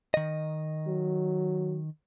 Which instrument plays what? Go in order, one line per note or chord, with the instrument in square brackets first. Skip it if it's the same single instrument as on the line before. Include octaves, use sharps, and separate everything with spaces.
[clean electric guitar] D#3 D#5
[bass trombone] F#3